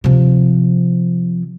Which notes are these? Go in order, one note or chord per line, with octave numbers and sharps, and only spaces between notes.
C3 F3